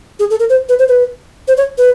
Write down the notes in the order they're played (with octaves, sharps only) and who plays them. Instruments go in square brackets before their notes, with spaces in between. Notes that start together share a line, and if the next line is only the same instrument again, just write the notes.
[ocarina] G#4
A4
A#4
C5
B4
C5
B4
C5
C#5
B4